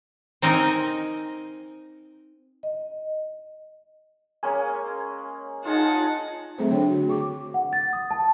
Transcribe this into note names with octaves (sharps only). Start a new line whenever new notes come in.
C4 D#4 A#4 D#5 G#5
D#5
G#3 A#3 C#4 G#5
D#4 F4 G#4 D#5 F#5 A5
F#3 A3 C4 G#4 A4 C5
D3 D4 C#5 G5
F#4
G#4 C#6 D6
F#5
A6
D#6
A5